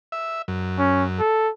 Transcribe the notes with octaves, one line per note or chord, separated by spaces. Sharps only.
E5
F#2
C#4
A4